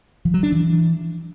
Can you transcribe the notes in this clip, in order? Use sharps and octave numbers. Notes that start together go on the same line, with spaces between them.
F3
F#3
D4
E3